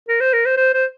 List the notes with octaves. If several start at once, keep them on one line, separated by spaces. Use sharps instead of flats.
A#4
C5
A#4
C5
C5
C5